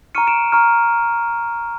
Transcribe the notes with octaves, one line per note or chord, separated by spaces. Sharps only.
A#5 C#6 F6 C#7 D#7
D7 E7
A#5 C#6 F6